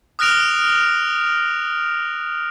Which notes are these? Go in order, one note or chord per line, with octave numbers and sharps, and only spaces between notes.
D#6 F6 F#6 A#6 D7 F7